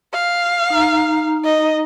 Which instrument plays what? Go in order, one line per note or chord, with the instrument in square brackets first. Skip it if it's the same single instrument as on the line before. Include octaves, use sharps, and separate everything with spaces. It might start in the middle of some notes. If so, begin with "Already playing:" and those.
[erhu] F5
[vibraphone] D#4 A#5
[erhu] D#5